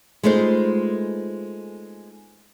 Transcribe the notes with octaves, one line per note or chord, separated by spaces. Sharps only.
G#3 A3 B3 D#4 F4 C5